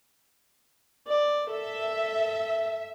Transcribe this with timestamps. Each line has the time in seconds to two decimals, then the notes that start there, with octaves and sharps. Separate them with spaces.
1.07 D5
1.49 A4 E5